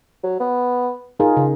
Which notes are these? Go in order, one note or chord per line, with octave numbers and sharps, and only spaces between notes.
F#3
B3
D#4 F4 G#4 A#4
C#3